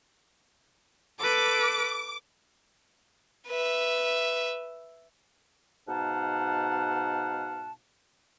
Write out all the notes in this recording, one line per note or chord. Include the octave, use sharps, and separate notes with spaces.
A4 B4 D6
B4 E5
G#2 B2 D#4 F5 F#5 A5